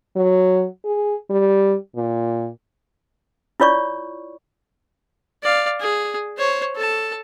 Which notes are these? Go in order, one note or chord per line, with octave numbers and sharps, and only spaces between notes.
F#3
G#4
G3
A#2
E4 F4 C#5 D5 C#6
D5 F5
G#4
C5 C#5
A4 A5